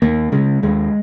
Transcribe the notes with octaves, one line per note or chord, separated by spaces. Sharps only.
D#2 A#3
C#3 G#3
D#2 G#3